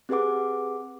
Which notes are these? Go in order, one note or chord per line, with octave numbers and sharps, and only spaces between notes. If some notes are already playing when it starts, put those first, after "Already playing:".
C4 G4 G#4 B4 F#5 D6